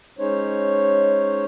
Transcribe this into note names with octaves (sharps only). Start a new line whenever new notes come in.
G#3 C#4 D#4 C5 C#5